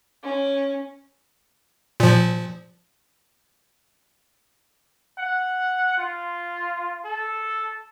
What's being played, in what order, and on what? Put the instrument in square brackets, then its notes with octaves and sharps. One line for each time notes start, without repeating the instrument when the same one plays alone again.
[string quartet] C#4
[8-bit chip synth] A#2 F3
[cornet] F#5
F4
A4